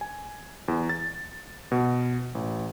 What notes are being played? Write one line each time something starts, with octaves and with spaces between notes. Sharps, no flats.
G#5
E2
A6
B2
A1